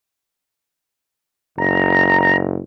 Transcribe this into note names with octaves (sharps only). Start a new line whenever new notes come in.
F#1 A#5